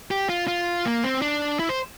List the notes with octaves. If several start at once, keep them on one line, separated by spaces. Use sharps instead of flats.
G4
F4
F4
A#3
C4
D4
E4
C5